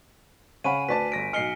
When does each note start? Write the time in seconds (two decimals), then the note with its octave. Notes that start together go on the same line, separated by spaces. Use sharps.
0.64 C#3 C#5 F5 F#5 G#5 B5 D#7
0.89 D2 B4 D5 A5 B6
1.12 G1 A#6 B6 D7
1.33 B1 D#5 G#5 F6 C7 C#7 G7